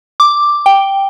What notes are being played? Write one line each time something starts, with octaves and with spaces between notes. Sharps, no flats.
D6
G5